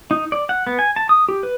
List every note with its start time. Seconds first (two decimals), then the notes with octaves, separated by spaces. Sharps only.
0.11 D#4
0.32 D5
0.49 F#5
0.67 B3
0.79 G#5
0.96 A5
1.09 D#6
1.29 G4
1.43 B4